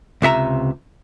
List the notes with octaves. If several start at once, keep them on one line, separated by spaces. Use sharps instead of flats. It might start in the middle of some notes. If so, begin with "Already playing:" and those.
C#2 C3 E5 A#5